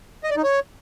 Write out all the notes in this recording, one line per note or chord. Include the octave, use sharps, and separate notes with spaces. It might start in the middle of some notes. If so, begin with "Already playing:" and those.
D#5
D5
D#4
C#5